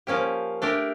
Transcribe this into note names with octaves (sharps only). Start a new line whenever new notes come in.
F3 A#3 C#4 G4
A3 D4 G4 A#4